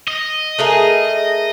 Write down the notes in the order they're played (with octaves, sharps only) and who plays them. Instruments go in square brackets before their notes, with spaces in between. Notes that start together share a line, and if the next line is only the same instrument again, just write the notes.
[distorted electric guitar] D#5
[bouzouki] A3 G#4 A#4